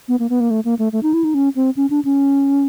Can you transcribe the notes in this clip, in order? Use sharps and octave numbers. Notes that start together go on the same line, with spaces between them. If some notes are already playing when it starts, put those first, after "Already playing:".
B3
A#3
B3
A#3
A3
A#3
A3
A3
D#4
E4
D#4
C#4
C4
C#4
D4
C#4